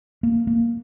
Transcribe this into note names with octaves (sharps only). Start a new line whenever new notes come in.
A#3
A#3